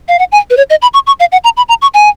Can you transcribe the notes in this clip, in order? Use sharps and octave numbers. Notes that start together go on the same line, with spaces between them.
F5
F#5
G#5
B4
C#5
D#5
B5
C#6
C#6
F5
F#5
A#5
B5
A#5
C#6
G#5